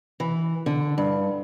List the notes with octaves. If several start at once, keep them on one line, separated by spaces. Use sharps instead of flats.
E3
D3
G2